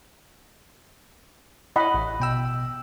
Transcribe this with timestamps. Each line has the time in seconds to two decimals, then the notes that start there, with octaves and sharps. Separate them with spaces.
1.76 E4 C#5 D#5 F#5 B5
1.94 A1
2.20 B2 G5 E6